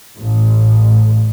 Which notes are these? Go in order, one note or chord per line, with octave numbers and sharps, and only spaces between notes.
A1